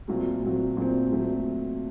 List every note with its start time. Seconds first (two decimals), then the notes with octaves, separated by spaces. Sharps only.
0.08 A#2 F#3 A3 C4
0.42 A#2 F#3 A3 C4
0.77 A#2 F#3 A3 C4
1.12 A#2 F#3 A3 C4